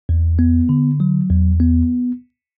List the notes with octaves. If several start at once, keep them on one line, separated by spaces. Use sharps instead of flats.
E2
B3
D3
F#3
E2
B3